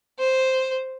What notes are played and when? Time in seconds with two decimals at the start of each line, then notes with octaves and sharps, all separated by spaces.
0.20 C5